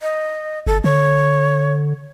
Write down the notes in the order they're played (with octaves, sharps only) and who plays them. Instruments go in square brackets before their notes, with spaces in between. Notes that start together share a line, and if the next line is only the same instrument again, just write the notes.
[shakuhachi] D#5
[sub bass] G1 [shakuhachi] A4
[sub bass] D3 [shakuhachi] C#5